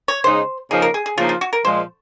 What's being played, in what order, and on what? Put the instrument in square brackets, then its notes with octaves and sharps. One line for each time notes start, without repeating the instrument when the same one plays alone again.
[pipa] C#5
[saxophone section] C#3 G#3 D#4 [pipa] C5
[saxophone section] C#3 F3 A#3 D#4 [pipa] G#4
[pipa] A#4
G#4
G#4
[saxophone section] C#3 F3 A#3 D#4 [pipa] F4
[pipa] F4
F#4
A#4
[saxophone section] A#2 F3 G#3 [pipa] C5